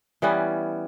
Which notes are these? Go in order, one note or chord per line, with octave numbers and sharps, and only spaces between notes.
E3 G3 B3 C#4